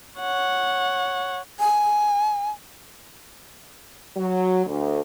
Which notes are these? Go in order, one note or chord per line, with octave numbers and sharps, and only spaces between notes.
C#5 F#5
G#5
F#3
D2